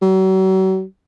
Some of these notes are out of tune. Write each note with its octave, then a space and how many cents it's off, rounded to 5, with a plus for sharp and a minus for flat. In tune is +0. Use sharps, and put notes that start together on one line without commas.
F#3 +40